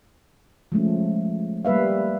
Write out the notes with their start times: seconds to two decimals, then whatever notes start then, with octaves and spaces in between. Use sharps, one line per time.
0.72 F3 G#3 A3 C#4
1.65 G3 A#3 B4 E5 F5